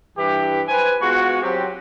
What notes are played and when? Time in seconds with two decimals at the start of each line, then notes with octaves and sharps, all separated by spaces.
0.17 G2 E3 G4
0.68 G4 B4 C5 G#5
1.01 G#3 B3 F4 F#4
1.43 F#3 C4 G4